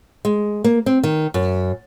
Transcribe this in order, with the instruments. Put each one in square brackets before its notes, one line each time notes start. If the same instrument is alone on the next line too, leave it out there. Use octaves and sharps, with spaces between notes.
[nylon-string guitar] G#3
A#3
C4
D#3
F#2